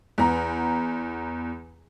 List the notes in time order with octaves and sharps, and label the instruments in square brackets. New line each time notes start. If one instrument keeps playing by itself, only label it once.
[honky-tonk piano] E2 B3 A#5